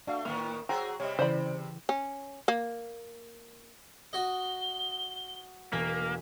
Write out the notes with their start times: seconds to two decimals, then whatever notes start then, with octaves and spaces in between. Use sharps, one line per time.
0.07 A3 D4 F#4 F5
0.25 A2 D#3 A#3 B3 F6
0.69 F#3 F#4 G#4 C5 G5 A#5
1.00 C3 G3 C#5 D#5
1.19 C#3 E3 C5 D5 B5
1.89 C#4
2.48 A#3
4.13 F#4 D#5 G7
5.72 E1 A#3 G#5 B6